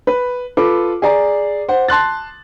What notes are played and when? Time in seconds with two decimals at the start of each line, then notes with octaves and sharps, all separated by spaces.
0.07 B4
0.57 F4 A4 B4 D6
1.02 G#4 D5 A#5
1.69 C5 F#5
1.88 A5 C6 F#6 A6